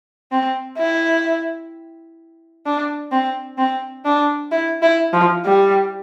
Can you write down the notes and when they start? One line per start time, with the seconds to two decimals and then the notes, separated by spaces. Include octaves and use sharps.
0.32 C4
0.78 E4
2.66 D4
3.12 C4
3.58 C4
4.05 D4
4.51 E4
4.82 E4
5.13 F3
5.45 G3